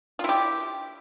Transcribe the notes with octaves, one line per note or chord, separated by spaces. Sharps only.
E4 F4 G4